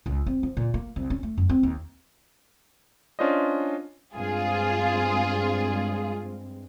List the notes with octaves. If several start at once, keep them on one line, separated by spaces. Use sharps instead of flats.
C#2
C4
F3
A#2
A#3
C2
C#4
A3
F#2
C4
D#2
C#4 D4 F4 C5 D5 D#5
G2 G#3 C4 F4 G#4